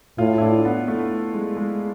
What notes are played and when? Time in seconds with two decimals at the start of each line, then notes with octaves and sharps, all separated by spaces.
0.18 A2 F4
0.38 E4
0.41 D4
0.65 B3
0.88 A3
1.34 G#3
1.57 G#3